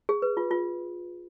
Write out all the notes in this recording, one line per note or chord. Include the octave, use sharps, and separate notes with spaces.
G#4
B4
F4
F4